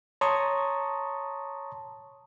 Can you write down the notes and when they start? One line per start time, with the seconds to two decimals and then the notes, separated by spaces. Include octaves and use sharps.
0.21 C#5 A5 A#5 C6 C#6 D#6